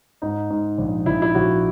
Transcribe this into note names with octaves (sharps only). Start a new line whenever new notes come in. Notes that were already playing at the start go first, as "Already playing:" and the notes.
G#2 D#4
G#2
A#1
A#1 E4
E4
A#1 F#4